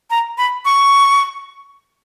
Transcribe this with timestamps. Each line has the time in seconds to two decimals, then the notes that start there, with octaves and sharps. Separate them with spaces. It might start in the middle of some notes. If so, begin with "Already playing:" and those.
0.10 A#5
0.38 B5
0.65 C#6